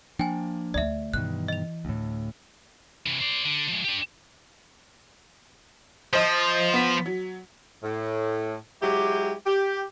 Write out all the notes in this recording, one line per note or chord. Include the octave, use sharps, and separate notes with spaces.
F3 A#3 D4 G5 G#5
D2 D5 E5
G2 B2 D#3 E3 F#6
D#5 F7
D2 A2
C3 E3
C5 D5
D3
F3 G#3
D4 G4
F3 C5 D#5
B3 B6
F#3
A2
F#3 G#3 E4 G4
G4